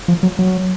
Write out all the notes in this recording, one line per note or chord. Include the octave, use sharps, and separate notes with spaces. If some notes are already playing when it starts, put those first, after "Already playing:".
F3
F#3
F#3